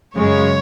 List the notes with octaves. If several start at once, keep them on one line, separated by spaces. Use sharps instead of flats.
F#2 C#3 G#3 C#5